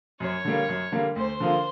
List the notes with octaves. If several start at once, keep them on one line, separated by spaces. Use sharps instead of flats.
F#2 C#5
D3 G3 A#3
F#2
D3 G3 A#3
D2 C5
D3 F3 A#3